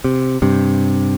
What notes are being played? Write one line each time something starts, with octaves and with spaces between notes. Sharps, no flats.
C3
G2 C3